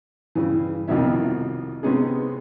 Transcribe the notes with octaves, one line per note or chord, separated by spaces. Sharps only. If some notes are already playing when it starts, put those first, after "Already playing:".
G2 C#3 E3
C2 F2 B2 D#3 C#4 E5
C3 G#3 B3 C#4 D#4 G#4